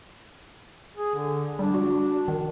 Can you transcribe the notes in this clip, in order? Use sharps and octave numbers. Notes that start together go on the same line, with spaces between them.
G#4
D3
G3 D4
F#4
D#3